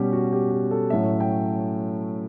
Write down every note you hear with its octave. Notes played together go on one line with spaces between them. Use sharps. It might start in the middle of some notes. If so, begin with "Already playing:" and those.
Already playing: B2 G3 C#4 G4
F#4
G4
G4
A4
A2 F#3 A3 C#4 E5
G5